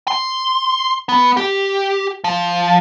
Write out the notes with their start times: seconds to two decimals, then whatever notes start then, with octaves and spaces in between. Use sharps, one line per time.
0.08 C6
1.09 B3
1.37 G4
2.24 F3